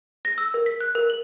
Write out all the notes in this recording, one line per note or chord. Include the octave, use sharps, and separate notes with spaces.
A#6
E6
A#4
B6
F#6
A#4
F#7